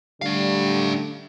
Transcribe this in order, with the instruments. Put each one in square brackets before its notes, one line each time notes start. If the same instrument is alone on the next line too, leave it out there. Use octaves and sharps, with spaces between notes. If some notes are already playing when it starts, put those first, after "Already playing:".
[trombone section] D3 A3 [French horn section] G3 [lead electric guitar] D4 F5